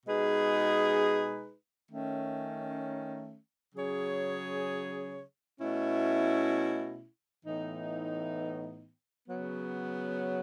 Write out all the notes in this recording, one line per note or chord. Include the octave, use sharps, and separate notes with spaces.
B2 G#3 D#4 G#4 B4
D#3 A3 C#4
C#3 F#3 C#4 G#4 C#5
B2 A3 C#4 E4
A2 E3 B3 D#4
C#3 F#3 B3